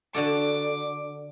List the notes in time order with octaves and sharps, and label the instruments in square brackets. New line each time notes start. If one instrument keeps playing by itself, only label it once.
[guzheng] D3 F#4 A4 [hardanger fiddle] D6